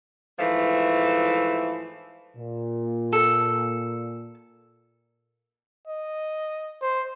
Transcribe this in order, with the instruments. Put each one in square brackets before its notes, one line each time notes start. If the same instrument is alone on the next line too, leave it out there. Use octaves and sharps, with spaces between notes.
[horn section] G#2 E3 F3 A3
[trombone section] A#2
[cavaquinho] A4
[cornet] D#5
C5